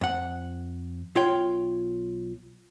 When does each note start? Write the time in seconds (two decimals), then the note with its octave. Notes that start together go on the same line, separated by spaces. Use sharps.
0.01 F2 F#5
1.15 B1 F4 C#5 G5